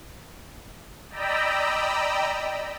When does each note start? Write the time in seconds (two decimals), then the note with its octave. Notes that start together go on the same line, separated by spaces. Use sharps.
1.10 D5 D#5 G5 A#5 B5 E6